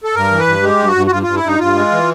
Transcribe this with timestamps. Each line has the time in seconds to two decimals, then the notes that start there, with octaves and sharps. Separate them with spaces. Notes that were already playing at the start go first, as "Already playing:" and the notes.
0.04 A4
0.15 G2 A#4
0.32 E3
0.40 B4
0.47 G2
0.63 G#3 G4
0.79 G2
0.87 F#4
0.96 G2
1.06 F#4
1.11 G2 F4
1.23 G2 F4
1.35 E4
1.43 G2 D#4
1.59 G2 F4
1.76 G#3
1.91 E3